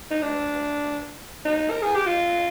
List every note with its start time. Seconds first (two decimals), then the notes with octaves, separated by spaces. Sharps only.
0.11 D#4
0.22 D4
1.45 D#4
1.70 A#4
1.82 G#4
1.95 G4
2.07 F4